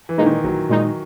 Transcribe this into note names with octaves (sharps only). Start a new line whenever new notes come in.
E3
A#2 G#3 D#4
D#3
A#1 F#3
A#2 G#3 D#4